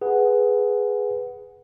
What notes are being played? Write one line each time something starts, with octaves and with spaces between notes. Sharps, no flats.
G#4 B4 F#5